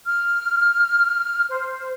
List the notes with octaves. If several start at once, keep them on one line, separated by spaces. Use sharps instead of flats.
F6
C5